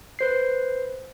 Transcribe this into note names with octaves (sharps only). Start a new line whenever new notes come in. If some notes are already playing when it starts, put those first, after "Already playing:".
B4 C5 C7